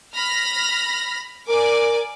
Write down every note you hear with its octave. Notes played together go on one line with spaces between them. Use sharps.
B5 F6 A#6
A#4 D5 G#5 D6